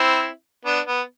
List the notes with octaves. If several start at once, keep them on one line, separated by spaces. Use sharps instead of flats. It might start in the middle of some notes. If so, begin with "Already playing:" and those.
Already playing: C4 E4
B3 D4
B3